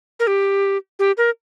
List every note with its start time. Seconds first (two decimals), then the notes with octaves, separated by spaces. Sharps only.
0.20 A#4
0.27 G4
0.99 G4
1.17 A#4